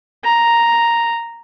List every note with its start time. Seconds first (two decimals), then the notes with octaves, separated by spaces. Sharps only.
0.24 A#5